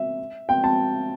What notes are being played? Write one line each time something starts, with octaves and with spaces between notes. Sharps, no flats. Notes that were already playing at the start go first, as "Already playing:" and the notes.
Already playing: E5
G5
A5